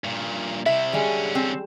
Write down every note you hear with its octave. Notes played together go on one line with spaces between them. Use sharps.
G2 A#2
C3 E4 E5
D3 G3 G#3 C#4
C4